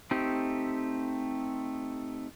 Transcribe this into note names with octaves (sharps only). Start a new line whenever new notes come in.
A3 C4 D#4 G4